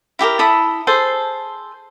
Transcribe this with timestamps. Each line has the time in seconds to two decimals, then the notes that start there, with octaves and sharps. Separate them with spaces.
0.19 E4 G4 G#4 A#4
0.39 E4 A4 B5 D#6
0.87 G#4 A4 C5